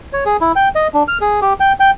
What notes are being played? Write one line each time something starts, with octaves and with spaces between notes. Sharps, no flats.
C#5
G#4
E4
G5
D#5
D4
F6
G#4
G4
G5
G5